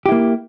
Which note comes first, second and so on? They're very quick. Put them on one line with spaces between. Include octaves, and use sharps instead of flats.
G4 E4 A#3